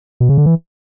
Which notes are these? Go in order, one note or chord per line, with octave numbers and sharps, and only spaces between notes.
B2
C#3
D3
E3